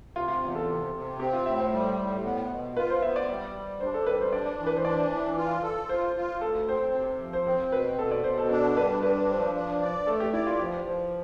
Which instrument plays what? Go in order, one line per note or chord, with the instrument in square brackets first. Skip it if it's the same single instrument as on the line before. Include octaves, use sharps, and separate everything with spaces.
[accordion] C3 [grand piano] F4
[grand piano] F4
[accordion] E2
[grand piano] A4
[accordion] C3
C3
[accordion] C4 [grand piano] G4
[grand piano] F4
[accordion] A2 [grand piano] E5
[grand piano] C5
[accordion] G3
A2
B3
B2
[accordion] F4 [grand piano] B4
[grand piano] C5
[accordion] B3 [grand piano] E5
[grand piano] D5
[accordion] G3
G3
[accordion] D4 [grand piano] C5
[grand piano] A4
[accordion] G3 [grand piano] B4
[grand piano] C5
[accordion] D4 [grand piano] D5
[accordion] E3
[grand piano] B4
C5
[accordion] D4 [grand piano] D5
[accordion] E3
F4
A4
[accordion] F4 [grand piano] C5
[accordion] F4
[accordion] D2 [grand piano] A4
[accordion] C4 [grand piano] C5
[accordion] C3
F3
[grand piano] C5
[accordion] C4 [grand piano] C5
[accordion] B2 [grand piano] B4
[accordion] B2 [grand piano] A4
[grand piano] D5
[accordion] B2 [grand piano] C5
[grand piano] A4
[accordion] D4 [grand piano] A4
[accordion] G2 [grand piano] B4
[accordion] D4 [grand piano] B4
[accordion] F3
D4
D5
[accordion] A3 [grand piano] A4
[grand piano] G4
[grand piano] E4 [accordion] D5
[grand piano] F4
[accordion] F3 [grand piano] G4
[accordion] F3